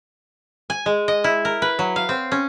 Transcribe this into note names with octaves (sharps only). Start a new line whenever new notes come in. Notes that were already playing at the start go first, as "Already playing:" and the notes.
G#5
G#3
D#5
E4
A#4
B4
F#3
F5
C4
C#4